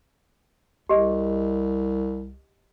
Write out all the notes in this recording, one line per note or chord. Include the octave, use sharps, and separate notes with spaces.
C2 G4 G#4 D#5